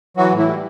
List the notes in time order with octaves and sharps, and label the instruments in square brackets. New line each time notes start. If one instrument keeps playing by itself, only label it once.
[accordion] E3 F#3 F#4
A2
E3 E4
G3